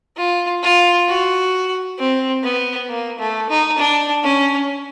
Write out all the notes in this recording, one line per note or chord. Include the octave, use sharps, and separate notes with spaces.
F4
F4
F#4
C4
B3
A#3
A3
D#4
D4
C#4